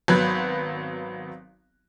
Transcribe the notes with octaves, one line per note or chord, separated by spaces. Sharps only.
G#1 F#3 B3 B5 F#6 G#6